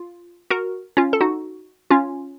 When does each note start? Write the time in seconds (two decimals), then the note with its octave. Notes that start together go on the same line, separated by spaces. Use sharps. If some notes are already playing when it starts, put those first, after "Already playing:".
Already playing: F4
0.50 F#4 A#4
0.97 C#4 F4
1.13 A4
1.21 D#4 F#4
1.90 C#4 F4